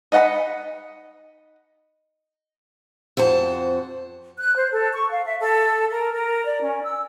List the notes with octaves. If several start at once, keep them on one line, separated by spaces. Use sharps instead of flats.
D#4 D#5 F#5 A5 B5
F2 F#4 C5 A5
F#6
C5
A4
C#6
F5
E5
A4
A#4
A#4
D5
C#4
E6